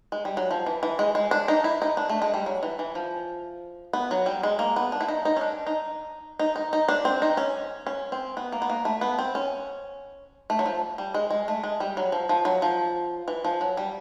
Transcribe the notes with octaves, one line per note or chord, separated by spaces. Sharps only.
G#3
G3
F#3
F3
E3
E3
G#3
G#3
D4
D#4
E4
D#4
D4
A3
G#3
G3
F#3
E3
E3
F3
B3
F#3
G3
G#3
A#3
B3
D4
E4
D#4
D#4
C#4
D4
D#4
D#4
D#4
D#4
D4
C4
D#4
C#4
C#4
C4
B3
A#3
B3
A#3
A3
B3
C4
C#4
A3
F#3
F3
G3
G#3
G#3
A3
G#3
G3
F#3
F3
F3
F#3
F3
E3
F3
F#3
G3